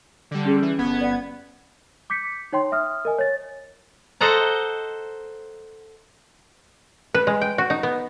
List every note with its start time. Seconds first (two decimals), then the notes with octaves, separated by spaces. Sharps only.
0.31 D3 G3
0.45 C#4 G#4
0.62 E3
0.78 G1 B3 G#6
1.01 D5 F#5
2.10 D6 G6 B6 C#7
2.52 D#4 C#5 G5 C6
2.72 E5 D#6 F6
3.05 A#4 D#5 G#5
3.18 C#5 A6
4.21 A4 C5 D#5 F#5 A5 A#5
7.14 B4
7.27 G#3
7.41 G5
7.58 F#4
7.70 D#4
7.83 B3